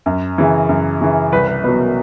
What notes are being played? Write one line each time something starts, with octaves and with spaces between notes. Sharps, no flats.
F#2
C#3 E3
F#2
C#3 E3
C2 B4
B4
B2 F#3 B4
A#4